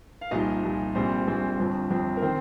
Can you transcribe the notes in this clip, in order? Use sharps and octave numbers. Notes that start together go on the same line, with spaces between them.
F5
C2 A#2 F3 D#4 D#5
C2 A#2 F3
A#1 A#2 G3 C4 C5
A#1 A#2 G3 C4
G1 F2 F3 C4
G1 F2 F3 C4
A#4
D#3 C4 C5